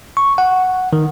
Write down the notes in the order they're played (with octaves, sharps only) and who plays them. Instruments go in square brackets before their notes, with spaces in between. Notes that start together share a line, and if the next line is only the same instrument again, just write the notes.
[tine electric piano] C#6
F#5
D#3